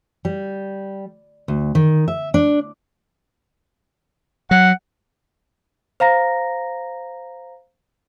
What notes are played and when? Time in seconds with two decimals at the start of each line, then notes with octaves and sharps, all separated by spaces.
0.25 G3
1.48 D2
1.75 D#3
2.08 E5
2.34 D4
4.51 F#3 F#5
6.00 C5 F5 A#5 A#6